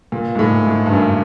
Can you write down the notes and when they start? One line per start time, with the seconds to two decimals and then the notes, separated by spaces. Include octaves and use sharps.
0.12 A#2
0.35 G#2
0.39 A2
0.66 G#2
0.86 G2
0.93 F#2